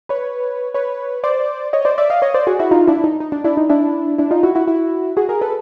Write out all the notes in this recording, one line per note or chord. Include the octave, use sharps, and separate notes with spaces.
B4 C#5
B4 C#5
C5 D5
C#5 D#5
C5 D5
D5 E5
D#5 F5
C#5 D#5
C5 D5
F#4 G#4
E4 F#4
D#4 F4
D4 E4
D#4
D#4
D4
D4 E4
D#4
D4 E4
D4 E4
D#4 F4
E4 F#4
E4 F#4
E4 F#4
F#4 G#4
G#4 A#4
A4 B4